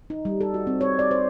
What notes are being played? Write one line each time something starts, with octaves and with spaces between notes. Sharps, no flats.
D#4
G3
A4
F#4
C4
C#5
D5
C5